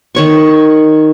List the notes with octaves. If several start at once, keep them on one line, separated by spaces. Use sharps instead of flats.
D#3 C#5 C#6